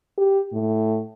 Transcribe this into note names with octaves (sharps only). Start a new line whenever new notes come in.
G4
A2